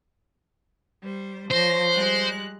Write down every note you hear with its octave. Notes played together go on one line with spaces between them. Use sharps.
G3 C5
F3 C5 C#5 A#6
G3 G#3 F#6